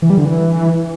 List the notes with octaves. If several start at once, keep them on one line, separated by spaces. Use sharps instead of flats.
E3
G3
D3
E3